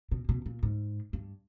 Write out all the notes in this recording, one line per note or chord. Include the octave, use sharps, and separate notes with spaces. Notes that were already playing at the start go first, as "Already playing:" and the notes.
B2
B2
A#2
G#2
G2